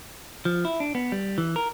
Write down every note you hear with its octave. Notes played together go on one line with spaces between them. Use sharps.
F3
E4
D4
B3
G3
E3
A#4